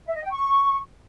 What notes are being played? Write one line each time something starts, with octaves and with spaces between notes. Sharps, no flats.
E5
D#5
G5
C#6